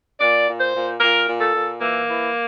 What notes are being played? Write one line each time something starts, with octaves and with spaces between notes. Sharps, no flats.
A#2 D5
A#2
C5
A#2
A#2 A#4
A#2
A4
A#2
E3 A#3
E3